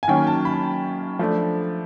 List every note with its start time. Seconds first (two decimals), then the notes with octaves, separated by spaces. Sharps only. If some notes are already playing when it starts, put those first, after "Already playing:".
0.03 G#5
0.08 D#3 F#3 A#3 C#4 G5
0.27 A5
0.45 B5
1.19 F3 A3 D4